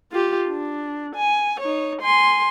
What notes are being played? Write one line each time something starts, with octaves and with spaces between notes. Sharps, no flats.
F4 G4
D4
G#5
D#4 C#5
G#5 C6